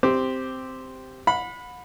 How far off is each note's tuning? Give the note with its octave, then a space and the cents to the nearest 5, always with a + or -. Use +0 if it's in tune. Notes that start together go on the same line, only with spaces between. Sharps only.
C4 -5 G4 +0 D6 +0
F#5 -40 B5 +0